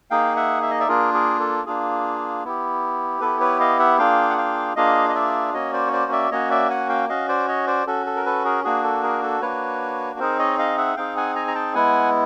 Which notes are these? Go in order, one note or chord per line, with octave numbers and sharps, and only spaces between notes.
A#3 D#4 G#4 F5 G5
E5 F#5
E5
D#5
D5 E5
A#3 D4 F4 G#4 A#4
G#4 A#4
A4
A#3 D4 F4 G#4
B3 E4 G4
B3 E4 G4 A4 B4
B4 C#5
D#5 F5
E5 F#5
A#3 D4 F4 G#4 F5 G5
F#5
F5 G5
A#3 D4 F4 G#4 D#5 F5
D#5
D5 E5
A#3 C#4 F#4 C#5 D#5
C5 D5
C#5
C5 D5
D5 E5
A#3 C#4 F#4 C#5 D#5
D5 E5
F#5 G#5
F5 G5
C#4 F#4 D#5 F5
C5 D5
C#5 D#5
C5 D5
C#4 F#4 A4
A4
A#4
A4 B4
G#4 A#4
A#3 D4 F#4 G#4
A4
G#4 A#4
A4
A#3 D4 F#4 B4 C#5
C4 D#4 G#4 A#4 C5
C#5 D#5
D#5 F5
E5 F#5
C4 D#4 G#4 F5 G5
F#5 G#5
G#5 A#5
A#5
G5 A5
G#3 B3 E4 F#5 G#5